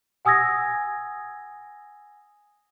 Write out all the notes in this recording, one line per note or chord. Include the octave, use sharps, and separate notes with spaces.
F#5 G#5 D#6 E6 G#6 A#6